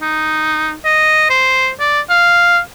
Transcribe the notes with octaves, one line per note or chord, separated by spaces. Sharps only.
D#4
D#5
C5
D5
F5